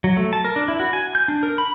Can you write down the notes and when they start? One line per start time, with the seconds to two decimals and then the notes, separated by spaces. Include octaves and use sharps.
0.04 F#3
0.17 A3
0.33 A5
0.45 A#4
0.56 D4
0.68 E4
0.80 F#4
0.93 G#5
1.15 G6
1.28 D4
1.43 A#4
1.58 B5